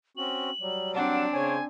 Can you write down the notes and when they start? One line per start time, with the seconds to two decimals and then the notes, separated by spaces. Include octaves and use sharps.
0.17 C4 C#4 F#4 F#7
0.61 F#3 G3
0.95 C4 D4 F#5 A5
1.32 C#3 C5 C#5 G#5